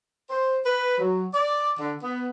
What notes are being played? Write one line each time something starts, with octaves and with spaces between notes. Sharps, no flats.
C5
B4
F#3
D5
D3
B3